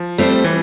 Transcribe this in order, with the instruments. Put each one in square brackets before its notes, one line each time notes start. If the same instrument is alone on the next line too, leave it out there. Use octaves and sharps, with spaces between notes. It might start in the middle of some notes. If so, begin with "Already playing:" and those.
Already playing: [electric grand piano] F3
[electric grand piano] G3 [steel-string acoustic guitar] A3 C4 G4 C5
[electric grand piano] E3